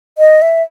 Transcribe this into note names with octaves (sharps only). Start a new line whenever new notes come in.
D#5
E5